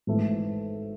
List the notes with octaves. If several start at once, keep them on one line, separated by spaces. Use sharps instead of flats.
G#1 G#2 E3 A3